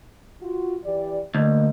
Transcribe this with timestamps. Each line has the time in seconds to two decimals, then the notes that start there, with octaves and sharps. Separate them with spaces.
0.41 F4 F#4
0.85 E3 G4 D5
1.35 D2 A#3 D#5